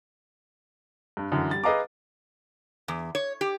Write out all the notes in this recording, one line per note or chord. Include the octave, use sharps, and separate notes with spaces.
G2
F#2 D3 E3
G3 A6
G#4 B4 D#5 F5 A#5 D6
E2
C#5
G4